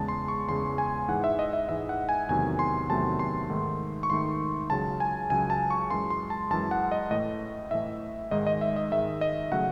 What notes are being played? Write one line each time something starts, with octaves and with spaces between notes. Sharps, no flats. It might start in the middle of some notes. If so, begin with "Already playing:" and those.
Already playing: E2 C#3 G#3 A5
C6
C#6
E2 C#3 G#3 C6
G#5
G#2 E3 G#3 F#5
E5
D#5
E5
G#2 E3 G#3 E5
F#5
G#5
E2 C3 D#3 F#3 A3 G#5
C6
E2 C3 D#3 F#3 A3 A5
C6
G#2 D#3 A3
C#6
G#2 D#3 A3 C6
C#2 C#3 F#3 A5
G#5
C#2 C#3 F#3 G#5
A5
C#6
F#2 E3 G#3 C6
C6
A5
F#2 E3 G#3 A5
F#5
D#5
A2 E3 A3 D#5
A2 E3 A3 E5
G#2 D#3 G#3 D#5
D#5
E5
D#5
G#2 D#3 G#3 E5
D#5
C#3 F#3 A3 F#5